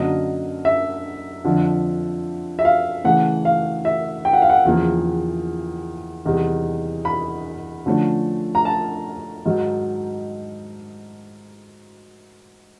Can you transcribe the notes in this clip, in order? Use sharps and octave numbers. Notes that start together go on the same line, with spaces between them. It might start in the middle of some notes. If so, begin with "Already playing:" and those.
Already playing: F#2 D3 F#3 A#3 D#5
E5
F2 D3 F3
E5
F5
C#3 E3 A3 F#5
F5
E5
G5
F#5
F5
F#5
E2 C#3 F3 A#3
E2 C3 D#3 G3
B5
D3 F3 A3 C#4
A#5
A5
G#2 D#3 F#3